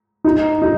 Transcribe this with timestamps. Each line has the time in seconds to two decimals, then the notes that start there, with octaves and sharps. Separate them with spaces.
0.24 D#4
0.62 D#4